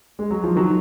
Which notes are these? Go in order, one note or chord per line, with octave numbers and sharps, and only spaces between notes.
G#3
F#3
F3
D#3 F#3